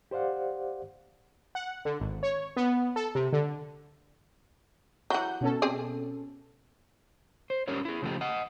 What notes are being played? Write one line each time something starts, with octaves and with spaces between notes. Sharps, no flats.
G4 C5 D5 F5 F#5
F#5
D3
G#1
C#5
B3
A4
C3
D3
E3 F#3 F#5 G6
B2 C#4 A4
C4 G#4 D5
C5
C#4 G4 A#4 C#5
E4 G#4
C#3 F3 A3 G4
D#5 F#5